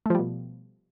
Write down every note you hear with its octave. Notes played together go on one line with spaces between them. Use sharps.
B2 F3 G3 A3